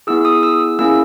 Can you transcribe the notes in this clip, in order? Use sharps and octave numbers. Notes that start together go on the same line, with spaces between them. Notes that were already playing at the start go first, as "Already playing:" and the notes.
B3 E4 G#4 E6
D#6
E6
A#3 C#4 E4 G#4 E6